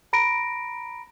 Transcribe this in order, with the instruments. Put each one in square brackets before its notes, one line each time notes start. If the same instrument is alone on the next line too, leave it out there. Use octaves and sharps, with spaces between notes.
[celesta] A#5 B5 A#6 D7